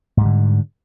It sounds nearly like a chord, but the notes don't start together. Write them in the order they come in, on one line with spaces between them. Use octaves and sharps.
G#2 G3 D3